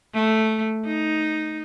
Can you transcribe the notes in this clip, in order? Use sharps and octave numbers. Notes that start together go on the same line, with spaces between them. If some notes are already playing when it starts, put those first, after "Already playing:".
A3
D#4